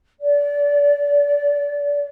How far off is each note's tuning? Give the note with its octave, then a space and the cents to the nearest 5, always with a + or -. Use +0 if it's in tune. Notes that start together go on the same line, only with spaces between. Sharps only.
D5 -30